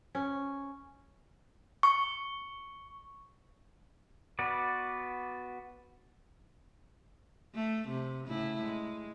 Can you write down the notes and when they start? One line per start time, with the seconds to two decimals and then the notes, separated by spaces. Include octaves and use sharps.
0.15 C#4
1.83 C#6
4.39 B3 F#4 B4 D5
7.54 A3
7.89 C3
8.28 A2 C#3 E4
8.61 G#3